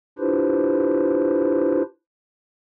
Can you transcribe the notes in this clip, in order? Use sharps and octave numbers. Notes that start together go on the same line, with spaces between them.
D4 E4 F4 G4 B4 C5